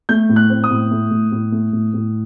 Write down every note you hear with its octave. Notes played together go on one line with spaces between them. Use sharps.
A3 G6
A2
F#6
C4
D#6
A2
A3
A2
A2
A3
A2
A2